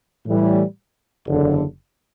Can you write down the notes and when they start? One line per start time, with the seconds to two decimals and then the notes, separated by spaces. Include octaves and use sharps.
0.25 A2 E3 G3
1.27 F#1 E2 D3